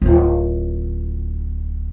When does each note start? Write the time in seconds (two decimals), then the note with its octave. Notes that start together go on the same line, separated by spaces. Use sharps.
0.02 D1 F4